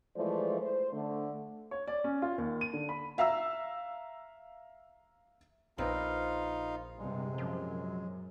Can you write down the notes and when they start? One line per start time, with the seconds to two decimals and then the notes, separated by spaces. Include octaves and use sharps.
0.17 E3 F3 G#3 A3 C5 D5
0.61 C5
0.92 D3 A3
1.71 C#5
1.88 D5
2.04 C#4
2.22 F4
2.38 D#2
2.61 D#7
2.73 D3
2.89 B5
3.18 E5 F5 A#5 E6
5.78 A#1 A#2 C4 D#4 F4 B4 F5
6.98 G2 C3 G#3
7.38 F#2 F3